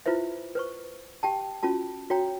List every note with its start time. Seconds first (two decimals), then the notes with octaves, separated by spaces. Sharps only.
0.06 E4 F4 B4 C5 E5
0.55 B4 C5 C#6
1.23 G4 G5 A5
1.63 C#4 F4 F#4 A5
2.10 F#4 C#5 G5 A#5